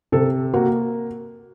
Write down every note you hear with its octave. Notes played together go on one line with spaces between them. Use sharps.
C3 A4
A#3 F#4